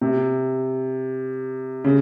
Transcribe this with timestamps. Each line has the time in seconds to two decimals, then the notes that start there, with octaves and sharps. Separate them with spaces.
0.01 C3
1.84 C#3